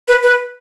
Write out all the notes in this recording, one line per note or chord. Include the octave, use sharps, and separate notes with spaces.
B4
B4